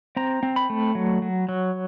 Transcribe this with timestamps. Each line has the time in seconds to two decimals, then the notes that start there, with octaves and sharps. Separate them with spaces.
0.16 C4 A#5
0.43 C4
0.56 B5
0.70 A3
0.95 F#3
1.22 F#3
1.49 F#3